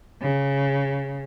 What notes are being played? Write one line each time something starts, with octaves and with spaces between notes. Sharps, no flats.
C#3